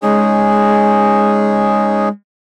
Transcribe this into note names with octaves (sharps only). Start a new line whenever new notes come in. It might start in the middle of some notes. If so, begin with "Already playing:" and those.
G#3 C#4 D#4 G#4